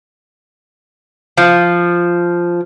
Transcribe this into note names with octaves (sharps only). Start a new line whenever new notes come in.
F3